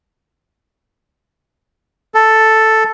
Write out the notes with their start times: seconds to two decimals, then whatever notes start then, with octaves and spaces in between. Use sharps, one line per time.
2.14 A4